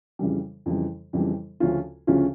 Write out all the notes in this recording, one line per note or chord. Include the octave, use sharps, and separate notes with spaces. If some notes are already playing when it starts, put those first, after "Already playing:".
F2 C#3 E3 G3
F2 C#3 E3 G3
F2 C#3 E3 G3
D2 C#3 F3 C#4 F4
D2 C#3 F3 C#4 F4